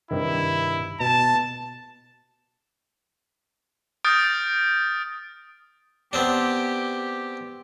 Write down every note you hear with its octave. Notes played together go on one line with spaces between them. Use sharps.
G2 C3 D#3 E4
B2 A5
D#6 F6 G6 A6 A#6 D7
B3 C4 D4 G4